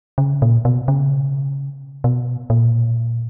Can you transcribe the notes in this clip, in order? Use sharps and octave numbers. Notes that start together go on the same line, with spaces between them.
C#3
A#2
B2
C#3
B2
A#2